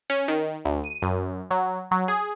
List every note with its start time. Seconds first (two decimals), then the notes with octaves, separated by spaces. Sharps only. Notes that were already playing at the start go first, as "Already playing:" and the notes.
0.10 C#4
0.28 D#3
0.65 D2
0.84 D#7
1.02 F#2
1.51 F#3
1.91 F#3
2.08 G#4